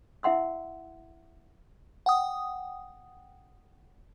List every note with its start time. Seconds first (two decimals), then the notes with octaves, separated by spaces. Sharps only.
0.23 E4 E5 F#5 C6 E6
2.06 F#5 G5 D#6